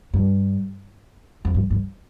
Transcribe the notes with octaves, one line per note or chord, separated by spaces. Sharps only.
G2
F2
G2
G2